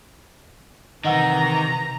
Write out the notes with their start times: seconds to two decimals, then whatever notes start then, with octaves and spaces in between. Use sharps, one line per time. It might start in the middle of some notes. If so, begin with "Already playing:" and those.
1.05 C3 D#3 E3 D#5 F#5 A#5 E6